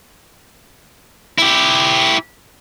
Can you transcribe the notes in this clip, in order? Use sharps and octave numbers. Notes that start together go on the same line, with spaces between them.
E4 G4